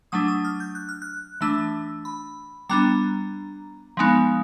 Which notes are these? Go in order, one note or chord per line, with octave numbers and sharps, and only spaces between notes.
F#3 A3 D4 D#6
D#6
F6
G6
F#6
F6
F#6
E3 A3 D4 E6
B5
G3 B3 D4 A#5
F3 G#3 B3 D#4